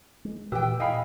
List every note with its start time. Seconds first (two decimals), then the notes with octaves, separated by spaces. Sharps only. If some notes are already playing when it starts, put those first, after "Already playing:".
0.25 G#3
0.52 A#2 E3 G4 B4 G5 E6
0.80 A#2 D#5 F5 G5 G#5 B5